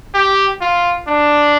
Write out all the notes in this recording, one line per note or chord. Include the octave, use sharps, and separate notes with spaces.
G4
F4
D4